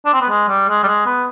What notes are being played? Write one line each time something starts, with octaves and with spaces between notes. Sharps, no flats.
D4
C4
B3
G#3
G3
G#3
G3
G#3
B3